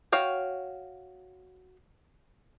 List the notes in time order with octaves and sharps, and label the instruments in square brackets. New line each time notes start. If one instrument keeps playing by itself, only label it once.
[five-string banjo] F#4 C#5 F5 G5